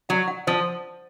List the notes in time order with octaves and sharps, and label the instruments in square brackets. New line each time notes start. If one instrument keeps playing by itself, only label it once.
[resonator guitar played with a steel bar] F#3 [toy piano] F#5
[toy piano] F#5
[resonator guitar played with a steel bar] F3 [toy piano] C5